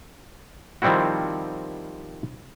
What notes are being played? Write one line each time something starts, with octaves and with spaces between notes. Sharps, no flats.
D#3 F3 G3 C4 E4 F#4